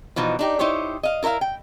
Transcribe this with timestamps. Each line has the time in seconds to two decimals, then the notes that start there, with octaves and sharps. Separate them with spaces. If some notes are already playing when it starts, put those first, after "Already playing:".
0.16 B2 E3 F3 D#4
0.39 D4 D#4 G4
0.59 D#4 E4 G4 C5 C#5
1.03 D#5 F5
1.23 E4 A#4 B4 E5 F5
1.41 G5